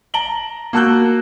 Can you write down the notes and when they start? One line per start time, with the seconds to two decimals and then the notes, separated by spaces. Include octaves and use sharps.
0.14 A5 A#5 D7 F#7 G7
0.73 A#3 F#4 A5 E6 F#6 G6